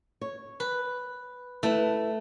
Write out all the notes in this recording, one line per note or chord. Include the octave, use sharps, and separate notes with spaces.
C#5
B4
A3 E4 B4